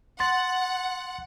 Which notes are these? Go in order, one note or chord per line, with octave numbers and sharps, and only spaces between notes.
F#5 C6 A6